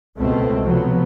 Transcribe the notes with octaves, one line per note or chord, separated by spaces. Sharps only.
C#2 B2 A3 C4
C3 F3 F#3 B3